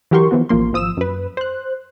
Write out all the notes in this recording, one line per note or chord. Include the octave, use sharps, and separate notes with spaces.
E3 F#3 G4 A#4 C6 C#6
E3 F3 B3 F#4
A1 F3 A#3 C6
G#1 F3 D#6 E6 E7
F#2 B4
C5 F#6